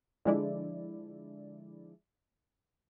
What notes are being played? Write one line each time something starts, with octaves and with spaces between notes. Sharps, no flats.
D3 F3 G#3 D4 E4 D5